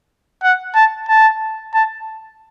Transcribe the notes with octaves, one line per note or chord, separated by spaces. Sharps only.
F#5
A5
A5
A5